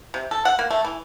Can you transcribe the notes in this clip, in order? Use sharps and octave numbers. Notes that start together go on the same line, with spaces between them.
C3
A4
F#5
A#3
A3
E3